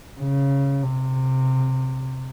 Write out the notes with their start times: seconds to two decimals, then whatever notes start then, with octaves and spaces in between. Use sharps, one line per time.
0.20 C#3
0.83 C3